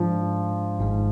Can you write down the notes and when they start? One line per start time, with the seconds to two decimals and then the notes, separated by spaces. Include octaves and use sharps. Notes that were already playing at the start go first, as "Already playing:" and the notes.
Already playing: G#2 F3 G#3 D4
0.79 G#1 G#2 G#3